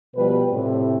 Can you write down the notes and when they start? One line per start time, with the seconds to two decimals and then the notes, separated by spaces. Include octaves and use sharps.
0.15 B2 F3 G3 B4
0.51 A2 C3